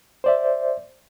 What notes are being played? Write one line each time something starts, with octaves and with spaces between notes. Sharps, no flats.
C5 D5 E5